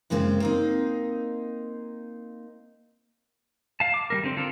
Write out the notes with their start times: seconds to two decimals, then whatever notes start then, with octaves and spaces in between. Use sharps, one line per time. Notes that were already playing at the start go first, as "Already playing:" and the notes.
0.10 F#2 C#3 G#3 A#3 C4
0.40 A#3 C4 D#4
3.80 F5 A5
3.94 D6
4.10 G3 A3 A#4
4.24 D3 C4
4.37 F4 A4 A#4